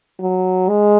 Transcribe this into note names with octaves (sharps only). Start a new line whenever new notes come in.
F#3
G#3